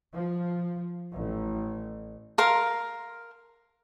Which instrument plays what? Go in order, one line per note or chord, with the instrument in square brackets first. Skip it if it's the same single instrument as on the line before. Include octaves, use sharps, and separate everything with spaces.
[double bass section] F3
A1
[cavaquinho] A#4 F5 C6